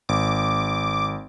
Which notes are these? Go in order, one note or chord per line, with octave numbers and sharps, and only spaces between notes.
G#1 D6